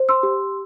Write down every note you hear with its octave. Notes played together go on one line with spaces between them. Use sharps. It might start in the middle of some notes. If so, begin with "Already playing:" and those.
Already playing: C5
C6 E6
G4